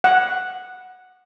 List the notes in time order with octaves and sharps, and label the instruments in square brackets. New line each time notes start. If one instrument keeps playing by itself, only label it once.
[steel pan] F#5